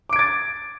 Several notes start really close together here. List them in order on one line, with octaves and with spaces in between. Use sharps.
D6 D7 G#6 A6